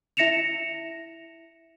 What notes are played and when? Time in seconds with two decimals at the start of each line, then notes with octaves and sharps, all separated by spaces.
0.17 E4 E5 A#6 C#7 E7 F7